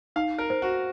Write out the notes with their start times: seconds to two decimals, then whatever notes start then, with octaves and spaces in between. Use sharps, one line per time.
0.16 D#4 F5
0.38 A#4
0.50 C5
0.62 F#4